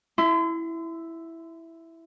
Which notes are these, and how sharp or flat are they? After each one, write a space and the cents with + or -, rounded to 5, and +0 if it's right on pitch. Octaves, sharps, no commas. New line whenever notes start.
E4 +0 C6 -40